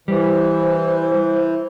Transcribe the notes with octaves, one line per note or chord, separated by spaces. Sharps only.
E3 G3 C5